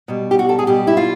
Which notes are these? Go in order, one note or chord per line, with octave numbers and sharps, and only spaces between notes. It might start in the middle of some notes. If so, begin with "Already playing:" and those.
B2 G3
G4
F#4
A4
G#4
B2 G3 G4
E4
F4